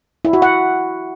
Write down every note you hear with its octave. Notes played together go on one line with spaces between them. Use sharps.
E4
F#4
F#5